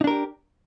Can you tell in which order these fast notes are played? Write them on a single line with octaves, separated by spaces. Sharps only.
D#4 D4 A#4 G4